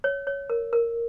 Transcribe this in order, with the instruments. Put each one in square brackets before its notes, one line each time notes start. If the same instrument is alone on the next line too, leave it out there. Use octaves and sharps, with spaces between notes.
[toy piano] C#5
C#5
A#4
A#4